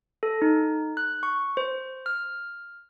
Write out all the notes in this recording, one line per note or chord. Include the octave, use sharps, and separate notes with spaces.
A4
D#4
F#6
C#6
C5
F6